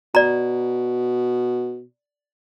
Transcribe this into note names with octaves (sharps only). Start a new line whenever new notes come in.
B2 D5 A#5